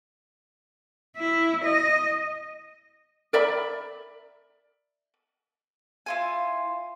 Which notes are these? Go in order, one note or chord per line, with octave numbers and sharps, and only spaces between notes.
E4
D#5
A#4 D5 E5 B5
E4 F4 G#5